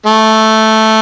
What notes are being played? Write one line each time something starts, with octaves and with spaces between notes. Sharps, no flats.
A3